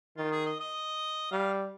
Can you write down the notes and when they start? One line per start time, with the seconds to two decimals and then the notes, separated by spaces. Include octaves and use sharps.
0.17 D#3 F4
0.32 G#4
0.46 D#5
0.60 D#5
1.32 G3 F5